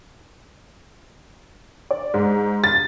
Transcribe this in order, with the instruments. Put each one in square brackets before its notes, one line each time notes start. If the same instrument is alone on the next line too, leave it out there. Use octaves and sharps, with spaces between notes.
[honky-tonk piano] D5
G#2
A6